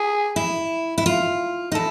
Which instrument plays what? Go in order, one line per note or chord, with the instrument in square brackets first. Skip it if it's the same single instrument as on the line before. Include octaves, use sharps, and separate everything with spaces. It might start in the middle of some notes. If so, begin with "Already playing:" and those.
Already playing: [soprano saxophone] G#4
[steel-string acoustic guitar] E4
E4
F4
D#4
[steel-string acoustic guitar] E4 [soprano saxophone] A4